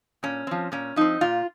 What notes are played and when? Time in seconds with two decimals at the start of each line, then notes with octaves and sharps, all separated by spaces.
0.23 A#2 C#4
0.47 F3 C4
0.72 A#2 C#4
0.96 F3 C4 D#4
1.21 A#2 F4